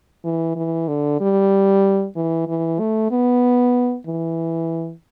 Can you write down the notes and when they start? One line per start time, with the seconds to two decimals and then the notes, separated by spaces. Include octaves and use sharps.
0.24 E3
0.56 E3
0.88 D3
1.20 G3
2.16 E3
2.47 E3
2.79 A3
3.11 B3
4.07 E3